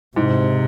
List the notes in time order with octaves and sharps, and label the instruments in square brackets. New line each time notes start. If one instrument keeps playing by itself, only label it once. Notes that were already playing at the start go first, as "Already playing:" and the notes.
[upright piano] G#2 [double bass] C3